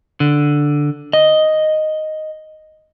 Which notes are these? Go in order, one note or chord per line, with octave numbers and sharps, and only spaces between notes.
D3
D#5